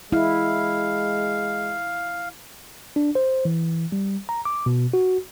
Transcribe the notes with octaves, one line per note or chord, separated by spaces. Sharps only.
G#3 E4 F5
D4
C5
E3
G3
A#5
D6
B2
F#4